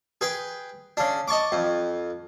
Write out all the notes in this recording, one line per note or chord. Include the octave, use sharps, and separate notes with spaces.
G#4 B4 G5
C#3 D4
D#5 A5 C#6 D6
F2